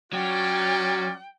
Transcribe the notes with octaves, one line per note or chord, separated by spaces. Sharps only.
F#3 C#4 F4 D5 G5